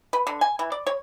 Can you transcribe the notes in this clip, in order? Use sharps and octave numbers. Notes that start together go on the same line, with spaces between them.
B4
D3
G#5
E3
D5
C#5